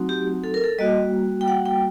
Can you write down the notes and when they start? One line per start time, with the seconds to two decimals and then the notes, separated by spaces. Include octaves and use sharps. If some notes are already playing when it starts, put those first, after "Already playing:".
Already playing: F#3 A3 C4 D#4 F#4
0.09 G4
0.44 A4
0.54 A#4
0.64 A4
0.78 G3 A#3 F#4 D#5
1.41 G5
1.48 F#5
1.66 G5